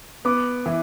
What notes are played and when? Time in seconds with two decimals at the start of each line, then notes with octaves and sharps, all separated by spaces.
0.25 B3 D6
0.66 E3